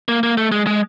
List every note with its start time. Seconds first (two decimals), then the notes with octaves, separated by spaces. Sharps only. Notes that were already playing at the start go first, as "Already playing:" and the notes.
0.08 A#3
0.23 A#3
0.37 A3
0.52 G#3
0.67 G#3